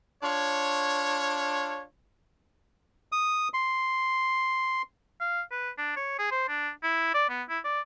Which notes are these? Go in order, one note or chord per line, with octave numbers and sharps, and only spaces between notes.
D4 F4 C#5
D#6
C6
F5
B4
D4
C#5
G#4
C5
D4
E4
D5
B3
E4
D5